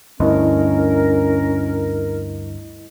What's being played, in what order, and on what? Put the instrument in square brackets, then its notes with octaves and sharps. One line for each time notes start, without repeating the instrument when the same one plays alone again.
[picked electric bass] D2 G2 [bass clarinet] C#4 [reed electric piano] E4 D#5 [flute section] A#4